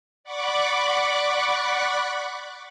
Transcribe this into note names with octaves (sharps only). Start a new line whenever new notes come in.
D5 F#5 B5 C#6 D6 F#6